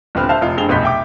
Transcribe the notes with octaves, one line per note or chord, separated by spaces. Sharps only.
D#1 D3 C4 B4 F6
C5 E5 F5 A5
F1 F4
F1 G2 C4 G#4 F7 G7
F1 B1 B4 C6 G6 B6
E5 G5 D6